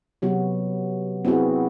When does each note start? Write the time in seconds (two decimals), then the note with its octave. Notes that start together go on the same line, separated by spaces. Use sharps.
0.22 C3 F#3 B3 F#4
1.25 B3 C4 E4 F#4 G#4